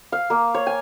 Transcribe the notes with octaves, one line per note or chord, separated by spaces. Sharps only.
F5
A#3
C#5
G#5